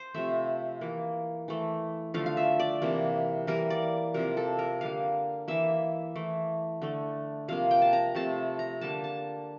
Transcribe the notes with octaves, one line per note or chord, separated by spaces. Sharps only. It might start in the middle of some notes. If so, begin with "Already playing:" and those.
Already playing: C5
C3 F3 A3 E5
E3 A#3
E3 A3
D3 F3 A3 F5
F5
E5
D5
C3 E3 A#3
E3 G3 A#3 A#4
D5
C3 F3 A#3 A#4
A4
A#4
D3 G3 A#3 F5
E3 A#3 E5
E3 A3
D3 A3
C3 F3 A#3 F5
G5
A5
A#5
C3 F3 A3 A5
A#5
D3 G3 A#3 A5
A5